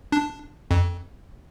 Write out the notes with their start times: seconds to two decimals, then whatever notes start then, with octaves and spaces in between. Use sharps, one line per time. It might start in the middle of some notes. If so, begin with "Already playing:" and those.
0.12 D4
0.71 F2